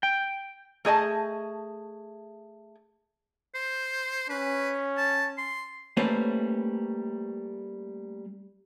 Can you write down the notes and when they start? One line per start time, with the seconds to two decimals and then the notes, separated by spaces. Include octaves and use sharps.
0.03 G5
0.85 A3 G#4 D#5 A5
3.55 C5
4.30 C#4 B4
4.97 A5
5.38 C6
5.97 G3 A3 A#3 C#4 B4 C5